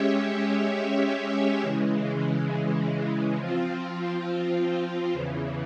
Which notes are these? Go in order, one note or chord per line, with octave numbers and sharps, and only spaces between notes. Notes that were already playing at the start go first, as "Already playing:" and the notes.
Already playing: G#3 C#4 G4 C#5 E5
C#3 E3 G#3
F3 C4 F4
E2 C#3 E3